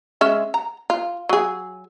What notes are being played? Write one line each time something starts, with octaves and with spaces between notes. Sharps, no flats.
G#3 C#4 E5
A#5
F4
F#3 G#4